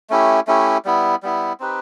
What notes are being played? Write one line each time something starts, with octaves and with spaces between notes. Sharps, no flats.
A3 C#4 E4 G4
A3 C#4 E4 G4
G3 B3 E4
G3 B3 E4
C4 D#4 G4 B4